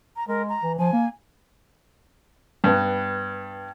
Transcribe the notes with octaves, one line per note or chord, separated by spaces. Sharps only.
A#5
G#3 A#4
A#5
E3
F3 G#5
A#3
G2 B3